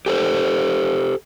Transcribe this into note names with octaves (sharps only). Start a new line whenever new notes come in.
G4 A4 C5